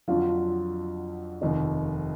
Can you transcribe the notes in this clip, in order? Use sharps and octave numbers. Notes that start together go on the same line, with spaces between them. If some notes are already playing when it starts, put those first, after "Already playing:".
F2 D3 F#3 F4
F1 D#2 D#3 D#4